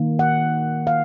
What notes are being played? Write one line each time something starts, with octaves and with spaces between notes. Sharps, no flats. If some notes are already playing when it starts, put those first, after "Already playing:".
Already playing: D#3 A#3
F#5
F5